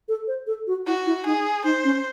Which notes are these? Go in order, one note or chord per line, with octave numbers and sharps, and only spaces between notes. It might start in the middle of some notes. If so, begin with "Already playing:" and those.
A4
C5
A4
F#4
E4 F#4
E4
D#4 G#4
D#4 C5
C#4